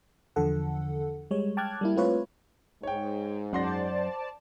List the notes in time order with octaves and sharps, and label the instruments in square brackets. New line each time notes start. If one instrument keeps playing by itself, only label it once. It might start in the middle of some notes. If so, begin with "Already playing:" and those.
[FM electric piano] E2 D3 F3 A4 F#5
G3 G#3 C#5
G5 A5 D6 F6 F#6 G#6
G3 A#3 E4
A3 C4 F4 B4 C#5
[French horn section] G#2 [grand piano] C#5 G5
[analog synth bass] F#2 [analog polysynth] C5 D5 A5 [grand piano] F#5 C6 A#6